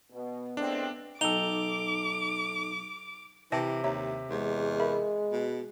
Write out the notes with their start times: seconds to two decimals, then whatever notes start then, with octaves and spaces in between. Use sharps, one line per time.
0.12 B2 B3
0.57 A2 G#3 C4 D4
1.21 B1 D#4 A4 G5 D6 F7 G7
3.52 C3 E3 G5 A5 A#6
3.84 D#2 C#5 E5 A#5
4.30 E2 G#3
4.80 A#4 E5 B5
5.32 B2